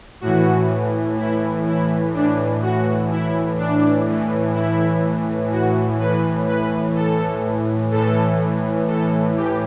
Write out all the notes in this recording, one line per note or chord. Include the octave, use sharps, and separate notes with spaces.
A2 E3 F#4
E4
E4
A2 E3 D4
F#4
E4
D4
A2 E3
E4
F#4
A2 E3 B4
B4
A4
A2 E3 A4
A4
G4